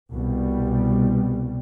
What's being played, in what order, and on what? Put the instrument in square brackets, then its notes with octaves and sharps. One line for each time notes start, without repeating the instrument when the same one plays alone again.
[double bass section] C2 B2 G3